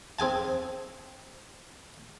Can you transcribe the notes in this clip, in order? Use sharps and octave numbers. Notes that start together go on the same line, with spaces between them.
C4 G#4 G#5 A5